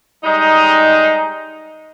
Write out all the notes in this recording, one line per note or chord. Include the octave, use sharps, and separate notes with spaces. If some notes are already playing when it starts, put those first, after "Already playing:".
G3 G#3 D#4